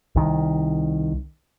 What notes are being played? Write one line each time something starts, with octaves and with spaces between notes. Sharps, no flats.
C2 D#3